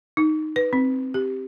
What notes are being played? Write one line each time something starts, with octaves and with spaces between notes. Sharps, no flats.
D#4
B4
C4
G4